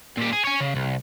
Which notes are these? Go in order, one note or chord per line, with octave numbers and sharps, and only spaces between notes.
A#2 G4
G#4
C#5 G#5
C#3
C2